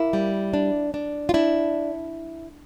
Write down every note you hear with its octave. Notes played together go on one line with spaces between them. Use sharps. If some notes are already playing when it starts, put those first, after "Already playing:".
Already playing: A#3 E4
G3
D4
D4
F4
D4 E4